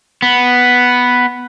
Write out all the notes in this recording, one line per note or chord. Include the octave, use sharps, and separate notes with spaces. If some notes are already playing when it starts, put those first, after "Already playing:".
B3